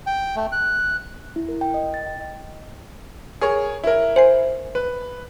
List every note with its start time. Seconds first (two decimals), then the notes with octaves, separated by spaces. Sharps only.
0.06 G5
0.36 A3
0.52 F#6
1.36 E4
1.49 A#4
1.61 G5
1.74 D#5
1.94 A6
2.06 G5
3.41 G#4 A#4 C#5
3.84 E4 A#4
4.16 C5 G#5 C7
4.75 B4